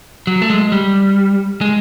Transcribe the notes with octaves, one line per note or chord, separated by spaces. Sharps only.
F#3
A3
G#3
G3
G#3